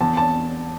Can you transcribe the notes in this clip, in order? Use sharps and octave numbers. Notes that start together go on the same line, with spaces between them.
E2 A5
A5